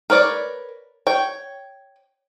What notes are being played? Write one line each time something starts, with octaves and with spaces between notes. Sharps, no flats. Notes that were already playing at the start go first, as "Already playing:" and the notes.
A#4 B4 C#5 D5
C#5 G5